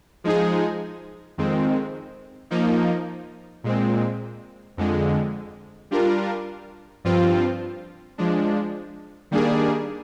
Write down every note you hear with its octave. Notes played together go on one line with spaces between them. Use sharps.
F3 G#3 D#4 G#4
F2 D#3 G#3 C4
F3 A#3 D#4
A#2 G#3 C4
F2 D3 G#3
G3 D4 F4 A#4
G2 F3 C4 F4
F3 G#3 D4
D#3 G3 A#3 D4 G#4